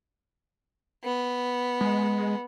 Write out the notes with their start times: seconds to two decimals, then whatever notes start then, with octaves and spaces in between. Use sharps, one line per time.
1.04 B3
1.81 G#3